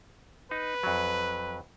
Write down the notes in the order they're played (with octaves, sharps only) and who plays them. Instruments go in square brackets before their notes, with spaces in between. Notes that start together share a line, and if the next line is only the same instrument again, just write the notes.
[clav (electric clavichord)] D#4 [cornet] B4
[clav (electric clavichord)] F2 F#3